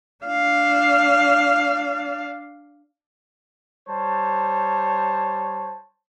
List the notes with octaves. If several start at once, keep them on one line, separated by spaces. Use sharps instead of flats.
D4 F5
G3 C5 C#5 A5